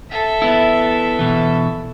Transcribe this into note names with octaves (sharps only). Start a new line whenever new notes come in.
A4 E5
B3 E4
B2 E3